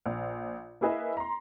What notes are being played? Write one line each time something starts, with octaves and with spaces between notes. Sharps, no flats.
A#1
A#3 E4 G#4 B4 D#5 E5
A#5 C6